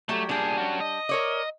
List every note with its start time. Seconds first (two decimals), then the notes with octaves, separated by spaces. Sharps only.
0.09 F#3 G3 A3 G4
0.29 A#2 G3 D4 G#4
0.58 C#4 F#4
0.80 D#5
1.09 A#4 C#5 D5